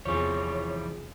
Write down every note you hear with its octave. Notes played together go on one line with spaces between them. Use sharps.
E2 C3 E3 F3 G3 F4 G#4 C#5